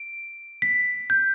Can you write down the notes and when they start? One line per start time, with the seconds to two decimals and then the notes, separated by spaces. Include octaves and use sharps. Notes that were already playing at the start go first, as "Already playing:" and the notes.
Already playing: D7
0.62 B6
1.10 G6